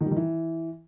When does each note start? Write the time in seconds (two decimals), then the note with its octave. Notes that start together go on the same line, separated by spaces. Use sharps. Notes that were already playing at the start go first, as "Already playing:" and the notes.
0.01 D#3
0.06 G3
0.11 D#3
0.16 E3